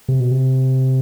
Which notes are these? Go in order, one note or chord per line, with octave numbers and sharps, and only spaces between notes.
C3
B2
C3